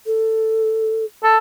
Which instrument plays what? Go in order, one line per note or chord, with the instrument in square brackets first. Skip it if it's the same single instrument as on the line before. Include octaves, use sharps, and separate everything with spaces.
[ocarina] A4
[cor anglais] A4